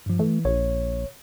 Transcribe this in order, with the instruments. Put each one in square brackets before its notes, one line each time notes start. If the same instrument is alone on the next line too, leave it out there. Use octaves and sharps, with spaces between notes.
[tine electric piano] G2 F3
[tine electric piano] E3 [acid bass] A3
[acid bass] A#1 [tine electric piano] C#5